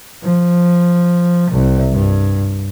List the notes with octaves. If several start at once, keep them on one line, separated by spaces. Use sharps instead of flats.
F3
C2
G2